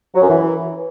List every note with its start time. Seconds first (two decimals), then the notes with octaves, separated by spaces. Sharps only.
0.15 F#3
0.22 F#2
0.29 E3